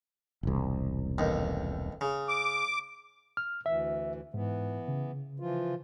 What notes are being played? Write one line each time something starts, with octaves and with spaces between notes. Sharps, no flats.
E1 C2
A1 D#2
C#3
D6
F6
D2 E3 E5
G#2 E3 B3
C#3
E3 F3 F4